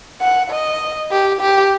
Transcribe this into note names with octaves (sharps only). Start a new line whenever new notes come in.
F#5
D#5
G4
G4